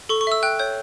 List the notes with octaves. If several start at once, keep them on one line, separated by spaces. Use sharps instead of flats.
A4 C#6
C#6
E5 E6
G5 F#6
C#5 G6